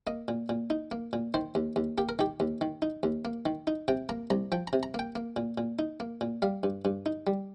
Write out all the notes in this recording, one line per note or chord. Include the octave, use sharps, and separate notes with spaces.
A#3 D#5
A#2
A#2
D#4
A#3
A#2
D#3 C5
D#2
D#2
A#3 G4
A#4
D#3 G4
D#2
D#3
D#4
D#2
A#3
D#3
D#4
C3 G5
A#3 A#5
C2 A#5
F3 G5
A#5
C3
A#5
A#3 G5
A#3
A#2
A#2
D#4
A#3
A#2
G3 F5
G2
G2
D#4
G3